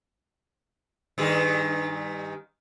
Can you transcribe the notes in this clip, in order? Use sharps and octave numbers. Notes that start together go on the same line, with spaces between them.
G2 D#3 G#4